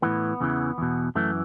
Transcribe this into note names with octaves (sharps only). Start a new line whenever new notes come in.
A2 E3 B3
E2 C#3 E3
E2 B2
F#2 E3 A3